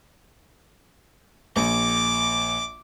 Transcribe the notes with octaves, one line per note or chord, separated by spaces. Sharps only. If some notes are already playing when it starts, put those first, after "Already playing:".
A#1 D6